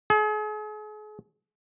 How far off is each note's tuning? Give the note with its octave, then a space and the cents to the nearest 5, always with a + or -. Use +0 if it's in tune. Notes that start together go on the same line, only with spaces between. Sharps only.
G#4 +40